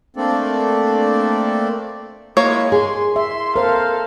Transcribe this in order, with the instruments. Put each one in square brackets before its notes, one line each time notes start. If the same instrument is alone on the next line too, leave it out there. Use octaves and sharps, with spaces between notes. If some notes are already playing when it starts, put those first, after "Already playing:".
[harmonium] A3 A#3 C4 D4 A4 D5
[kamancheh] G#3 E4 [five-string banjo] A#3 C#5
[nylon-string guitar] G#4 [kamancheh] C6
[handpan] E5 [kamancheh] C6
[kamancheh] A4 F5 [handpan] A#4 C5